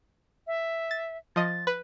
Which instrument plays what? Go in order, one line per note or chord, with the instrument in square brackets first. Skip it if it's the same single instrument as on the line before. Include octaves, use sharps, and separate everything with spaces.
[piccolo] E5
[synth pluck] A6
[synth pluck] F3 D#5 [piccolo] A6
[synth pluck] B4